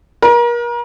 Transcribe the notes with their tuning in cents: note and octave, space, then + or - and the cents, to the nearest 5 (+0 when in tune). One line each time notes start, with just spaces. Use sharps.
A#4 +35